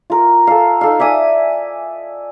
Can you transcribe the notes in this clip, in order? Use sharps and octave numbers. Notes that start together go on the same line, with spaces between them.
F4 A#4
A4 F5
D#4 A4 F5
D5 E5 G#5 D#6